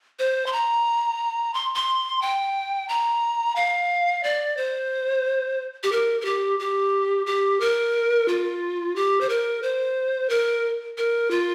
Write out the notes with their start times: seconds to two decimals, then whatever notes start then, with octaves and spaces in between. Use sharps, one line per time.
0.19 C5
0.46 C6
0.53 A#5
1.54 C6
1.75 C6
2.22 G5
2.89 A#5
3.56 F5
4.23 D5
4.57 C5
5.83 G4
5.92 A#4
6.21 A#4
6.25 G4
6.59 G4
7.26 G4
7.60 A#4
8.28 F4
8.96 G4
9.21 C5
9.29 A#4
9.63 C5
10.30 A#4
10.98 A#4
11.31 F4